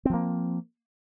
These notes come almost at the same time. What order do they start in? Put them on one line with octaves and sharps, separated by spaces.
C4 F3 A#3